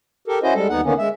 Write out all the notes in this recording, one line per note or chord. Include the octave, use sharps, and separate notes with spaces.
G4 A4 A#4
C#4 E4 F#4 C5 D#5
G3 G#3 A4
D#2 B3 D#4 F#5
D3 D#3 A#3 B3 C#4
G#3 E5